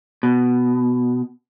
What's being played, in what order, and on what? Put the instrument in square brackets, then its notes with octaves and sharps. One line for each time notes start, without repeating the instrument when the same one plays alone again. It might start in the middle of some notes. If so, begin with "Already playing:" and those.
[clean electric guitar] B2